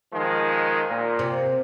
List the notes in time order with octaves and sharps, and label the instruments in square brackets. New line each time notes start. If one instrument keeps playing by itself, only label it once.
[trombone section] D#3 F3 G#3
A#2
[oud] C3